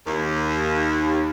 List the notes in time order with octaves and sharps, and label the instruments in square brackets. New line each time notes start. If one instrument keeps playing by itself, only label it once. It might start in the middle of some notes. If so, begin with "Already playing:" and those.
[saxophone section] D#2